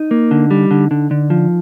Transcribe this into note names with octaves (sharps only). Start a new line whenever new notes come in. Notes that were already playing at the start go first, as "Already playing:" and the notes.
Already playing: D#4
A#3
D3
G3
D3
D3
D3
F3